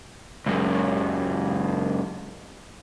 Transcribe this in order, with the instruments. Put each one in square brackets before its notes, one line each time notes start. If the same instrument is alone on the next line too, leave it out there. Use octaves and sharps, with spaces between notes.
[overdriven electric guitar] C#2 F#2